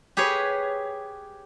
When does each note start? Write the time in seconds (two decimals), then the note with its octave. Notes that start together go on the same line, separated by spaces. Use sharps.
0.17 G4 G#4 B4 C#5